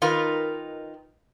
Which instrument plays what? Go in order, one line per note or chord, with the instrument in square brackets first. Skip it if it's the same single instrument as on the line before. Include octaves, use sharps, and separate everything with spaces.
[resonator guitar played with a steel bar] D#3 D#4 F4 A#4 B4